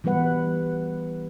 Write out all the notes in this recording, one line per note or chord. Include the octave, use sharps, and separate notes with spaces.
E3 G3 B3 B4 F#5